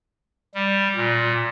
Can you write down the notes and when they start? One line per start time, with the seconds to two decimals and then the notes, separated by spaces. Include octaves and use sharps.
0.55 G3
0.96 A#2